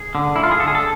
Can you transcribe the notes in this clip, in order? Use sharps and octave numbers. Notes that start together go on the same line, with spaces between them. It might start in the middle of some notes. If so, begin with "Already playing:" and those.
Already playing: G#4
D3
A3 E4
F4
G#4
D3 A4
G#4
A4